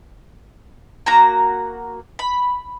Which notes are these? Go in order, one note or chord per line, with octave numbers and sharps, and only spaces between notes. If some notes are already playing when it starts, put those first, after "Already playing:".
A#3 F#4 A#5
B5